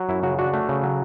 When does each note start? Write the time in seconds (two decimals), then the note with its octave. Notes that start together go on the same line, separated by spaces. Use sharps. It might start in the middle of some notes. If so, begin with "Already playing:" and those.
Already playing: F#3
0.09 F#2 E4
0.23 C#3 F#4
0.38 D4 F#4
0.53 A3
0.69 C#3
0.83 F#3